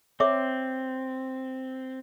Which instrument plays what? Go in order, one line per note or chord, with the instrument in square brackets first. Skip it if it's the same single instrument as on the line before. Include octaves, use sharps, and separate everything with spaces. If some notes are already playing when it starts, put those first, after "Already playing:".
[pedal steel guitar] C4 [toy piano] C#5 E5 D6